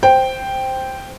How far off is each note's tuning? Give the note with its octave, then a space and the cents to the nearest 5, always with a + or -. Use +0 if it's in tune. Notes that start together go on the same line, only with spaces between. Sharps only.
C5 +0 G5 +0